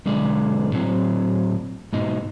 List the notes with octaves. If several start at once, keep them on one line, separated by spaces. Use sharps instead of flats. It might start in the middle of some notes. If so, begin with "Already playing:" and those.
B1 D3 G#3 D5
A2 F#3 C4
G#2 B2 D#4